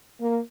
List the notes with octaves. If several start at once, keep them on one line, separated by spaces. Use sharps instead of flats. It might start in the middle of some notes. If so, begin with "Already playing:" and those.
A#3